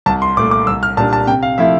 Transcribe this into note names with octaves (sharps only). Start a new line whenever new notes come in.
C2 A5
C6
A#2 A3 D6
D6
C2 E6
F6
A#2 G3 D4 A5
A5
C3 G5
F5
F3 A3 E4 E5